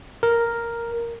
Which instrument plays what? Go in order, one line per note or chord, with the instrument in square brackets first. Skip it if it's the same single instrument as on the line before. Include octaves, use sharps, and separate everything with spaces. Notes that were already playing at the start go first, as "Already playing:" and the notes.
[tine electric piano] A#4